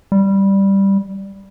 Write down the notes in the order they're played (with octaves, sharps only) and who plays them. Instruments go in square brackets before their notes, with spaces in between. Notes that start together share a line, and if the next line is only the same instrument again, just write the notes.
[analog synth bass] G3